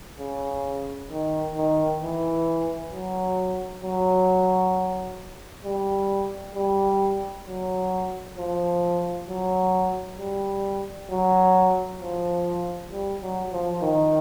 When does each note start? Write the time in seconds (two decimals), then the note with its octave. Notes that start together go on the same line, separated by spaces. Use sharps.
0.19 C#3
1.10 D#3
1.56 D#3
2.01 E3
2.92 F#3
3.84 F#3
5.65 G3
6.55 G3
7.46 F#3
8.38 F3
9.29 F#3
10.19 G3
11.10 F#3
12.01 F3
12.92 G3
13.22 F#3
13.52 F3
13.82 D#3